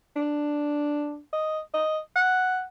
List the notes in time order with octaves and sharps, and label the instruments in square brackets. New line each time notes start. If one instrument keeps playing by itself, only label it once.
[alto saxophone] D4
D#5
D#5
F#5